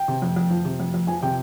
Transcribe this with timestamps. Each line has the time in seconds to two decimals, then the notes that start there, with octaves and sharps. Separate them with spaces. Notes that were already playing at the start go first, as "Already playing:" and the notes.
Already playing: G5
0.08 C3
0.22 F2
0.36 F2
0.51 F3
0.65 C3
0.80 F2
0.94 F2
1.07 F3 G#5
1.22 C3 G5